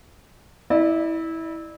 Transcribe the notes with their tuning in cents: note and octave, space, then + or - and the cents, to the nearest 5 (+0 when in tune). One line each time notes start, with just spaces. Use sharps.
E4 -20 D5 +35